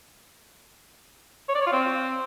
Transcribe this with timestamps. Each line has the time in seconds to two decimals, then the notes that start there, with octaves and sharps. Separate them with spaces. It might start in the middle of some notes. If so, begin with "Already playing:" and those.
1.49 C#5
1.55 D5
1.61 C#5
1.67 F4
1.73 C4